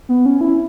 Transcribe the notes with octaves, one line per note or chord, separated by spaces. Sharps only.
B3
C#4
E4